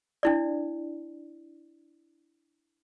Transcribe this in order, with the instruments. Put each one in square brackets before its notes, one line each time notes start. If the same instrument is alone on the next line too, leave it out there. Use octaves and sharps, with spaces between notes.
[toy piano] D4 E4 D5